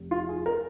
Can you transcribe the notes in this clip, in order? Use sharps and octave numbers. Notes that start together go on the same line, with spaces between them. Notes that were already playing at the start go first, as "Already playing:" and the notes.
Already playing: F1
F4
G#4
A#4